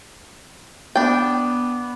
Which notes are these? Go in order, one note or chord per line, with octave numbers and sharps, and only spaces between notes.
B3 D4 G5